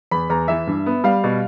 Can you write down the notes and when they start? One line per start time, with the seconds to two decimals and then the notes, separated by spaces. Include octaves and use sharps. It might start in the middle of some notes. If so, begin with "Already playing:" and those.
0.11 E2 B5
0.30 E2 A#5
0.48 E3 E5
0.67 G2
0.86 B3
1.04 G3 F5
1.24 B2